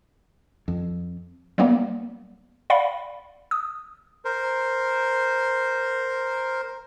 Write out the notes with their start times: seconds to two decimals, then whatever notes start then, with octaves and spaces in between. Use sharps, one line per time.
0.68 F2
1.58 F#3 G3 A#3 B3
2.70 D5 F5 F#5 B5
3.51 D#6
4.25 A#4 C5